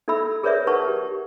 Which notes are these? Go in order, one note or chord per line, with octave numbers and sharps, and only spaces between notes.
D#4 A4 E5 B5 E6
G#4 A#4 B4 C#5 D5 E5
D#4 A#4 B4 F#5 A5 C#6
G4